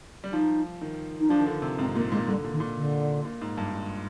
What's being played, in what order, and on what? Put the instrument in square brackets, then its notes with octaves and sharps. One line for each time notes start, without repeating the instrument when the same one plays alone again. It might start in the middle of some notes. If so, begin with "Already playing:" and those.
[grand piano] G3
[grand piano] F3 [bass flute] D#4
[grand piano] D#3
[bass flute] D#4
[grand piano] F3 [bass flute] D4
[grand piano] D#3
D3
C3
[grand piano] G#2 [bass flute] C4
[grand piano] A#2 [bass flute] A#3
[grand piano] A#2 [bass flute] G#3
[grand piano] D3 [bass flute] G3
[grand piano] A#2
[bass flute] D#3
[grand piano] A#2
[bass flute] D3
[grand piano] A#2
G#2
G2
G#2